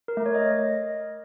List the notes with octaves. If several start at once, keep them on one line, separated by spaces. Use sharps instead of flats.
A#4
A3
C#5
D#5